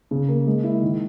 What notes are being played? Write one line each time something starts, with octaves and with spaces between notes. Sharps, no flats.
C#3
A#3
G#3
E4
D#3